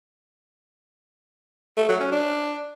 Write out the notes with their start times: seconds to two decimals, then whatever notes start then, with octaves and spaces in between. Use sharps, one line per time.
1.77 A3
1.89 F#3
2.00 C#4
2.12 D4